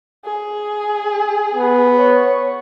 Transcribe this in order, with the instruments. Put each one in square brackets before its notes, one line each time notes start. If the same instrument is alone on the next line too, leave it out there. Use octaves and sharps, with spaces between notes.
[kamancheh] G#4
[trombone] B3
[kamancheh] C#5